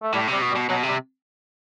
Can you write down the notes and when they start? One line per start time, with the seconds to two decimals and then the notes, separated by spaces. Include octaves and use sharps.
0.02 A3
0.14 A2 G3
0.28 C3 G3
0.42 B2
0.51 G3
0.56 B2
0.69 B2 F#3
0.83 C3 G3